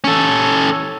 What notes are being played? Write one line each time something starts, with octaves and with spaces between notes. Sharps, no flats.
C#4 A4